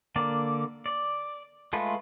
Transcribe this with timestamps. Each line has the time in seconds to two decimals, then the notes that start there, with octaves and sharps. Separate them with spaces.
0.16 D3 A#3 D5
0.86 D5
1.73 G#3 A3 F4 B4